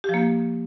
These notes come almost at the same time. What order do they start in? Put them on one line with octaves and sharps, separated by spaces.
G4 F3 A#3